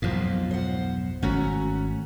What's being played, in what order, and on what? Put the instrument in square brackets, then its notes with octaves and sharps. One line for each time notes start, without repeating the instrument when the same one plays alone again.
[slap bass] B1 F2 G#2 [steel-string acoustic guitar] F3 A#3
[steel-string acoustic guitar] C5 F#5
[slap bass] G#1 A3 [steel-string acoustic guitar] C#4 F#4 A#5